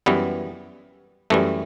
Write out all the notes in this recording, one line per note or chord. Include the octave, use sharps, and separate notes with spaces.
F#2 E3 G3 B3
F#2 E3 G3 A3